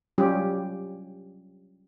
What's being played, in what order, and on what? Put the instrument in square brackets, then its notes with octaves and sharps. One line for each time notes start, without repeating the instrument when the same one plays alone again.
[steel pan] F#3 G3 C#4 F4 G4